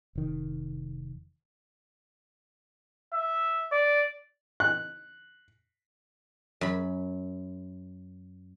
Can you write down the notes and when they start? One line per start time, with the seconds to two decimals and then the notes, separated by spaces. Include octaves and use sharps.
0.15 F1 D#3
3.14 E5
3.72 D5
4.60 F#6
6.61 F#2 B5